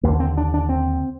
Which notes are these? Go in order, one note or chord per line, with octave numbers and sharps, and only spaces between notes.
D#2 D3 A#3
C4
D4
D4
C4